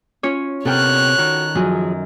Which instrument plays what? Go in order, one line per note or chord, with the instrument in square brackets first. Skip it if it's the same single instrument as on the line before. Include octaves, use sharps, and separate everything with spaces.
[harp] C#4 F4 C#5
[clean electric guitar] C3 B3 A#4 [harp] A4 G5 F6 [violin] C#5 F#6
[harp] D#3 [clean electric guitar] F#4
[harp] F#2 [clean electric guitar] F3 F#3 G#4